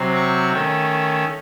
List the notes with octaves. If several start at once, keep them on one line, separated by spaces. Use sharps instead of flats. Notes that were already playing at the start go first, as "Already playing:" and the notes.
Already playing: C3 F#3 C4
C#6
D#3 A3 C#4